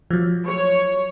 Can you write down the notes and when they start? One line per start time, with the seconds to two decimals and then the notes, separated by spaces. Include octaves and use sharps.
0.11 F3 F#3
0.46 C#5